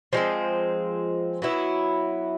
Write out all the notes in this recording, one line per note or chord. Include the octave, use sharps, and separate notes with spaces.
F3 G#3 C4
F#3 B3 E4